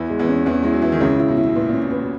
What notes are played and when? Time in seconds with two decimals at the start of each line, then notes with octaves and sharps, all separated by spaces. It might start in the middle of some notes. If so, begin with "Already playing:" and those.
Already playing: E2 E3 E4
0.10 G#3
0.19 E2 E3
0.28 C#4
0.46 E2 E3 C#4
0.63 G#3 E4
0.73 F#3
0.82 E3 E4
0.92 D#3
1.00 C#2 C#3 C#4
1.19 E4
1.28 B2
1.37 E4
1.47 B2
1.55 A#2 B4
1.69 A#2 C#4
1.82 B2
1.91 B4
1.97 B2